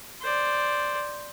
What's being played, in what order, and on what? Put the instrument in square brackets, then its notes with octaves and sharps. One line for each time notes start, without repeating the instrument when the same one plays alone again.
[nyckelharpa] C5 D5